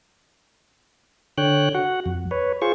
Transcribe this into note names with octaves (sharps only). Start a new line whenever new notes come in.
D3 C#5 G5 F#6
F#4 F#5
F2
B4 C#5
F4 G#4 C5 C#6